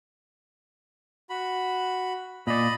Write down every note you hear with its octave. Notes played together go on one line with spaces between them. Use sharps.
F#4 B5
A#2 D5 D#5 B5